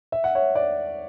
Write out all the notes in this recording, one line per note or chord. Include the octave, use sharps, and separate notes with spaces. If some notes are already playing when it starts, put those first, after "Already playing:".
E5
F#5
C#5 E5
D5 F#5